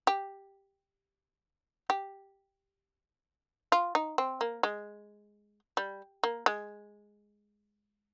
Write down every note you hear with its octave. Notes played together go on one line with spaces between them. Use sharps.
G4
G4
F4
D#4
C4
A#3
G#3
G3
A#3
G#3